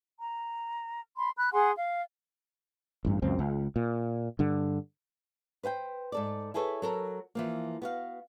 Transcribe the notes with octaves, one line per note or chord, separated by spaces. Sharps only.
A#5
B5 C6
B5 F#6
G#4 F#5 G#5 C6
F5
A1 G2
C#2 F#2 C4
C#2
A#2
G2 D3
B4 C5 F#5 G5
G#2 A4 D5
E4 G#4 A4 B4 C#5
F#3 A4 A#4
E3 F3 A#3
B3 F#4 F5